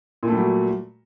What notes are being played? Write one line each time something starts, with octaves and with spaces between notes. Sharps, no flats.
A#2 F#3 G3 A3